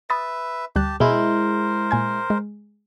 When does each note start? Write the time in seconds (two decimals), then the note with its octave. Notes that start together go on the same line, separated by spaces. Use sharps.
0.10 B4 E5 B5 D#6 A6
0.76 D2 G3 G4 A5 F#6
1.00 B2 G#3 E4 A#4 C5
1.91 A#2 G#5 G#6
2.30 G#3